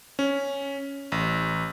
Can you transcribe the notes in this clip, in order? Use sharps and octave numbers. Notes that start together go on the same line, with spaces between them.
C#4
A1